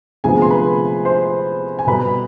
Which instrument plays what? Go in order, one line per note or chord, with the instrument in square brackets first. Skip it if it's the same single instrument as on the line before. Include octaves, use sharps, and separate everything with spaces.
[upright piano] D2 C3 F3 G#3 B3 G#4 G#5
C6
B4 B5
C5 C6
G#5
B2 G3 B3 B4 B5